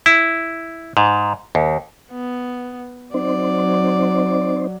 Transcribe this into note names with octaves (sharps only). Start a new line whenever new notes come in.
E4
G#2
D#2
B3
F#3 C4 D#4 C5 D5